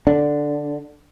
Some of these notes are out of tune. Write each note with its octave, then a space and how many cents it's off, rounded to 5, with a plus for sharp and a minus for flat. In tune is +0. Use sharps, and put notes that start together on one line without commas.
D3 +0 D4 +0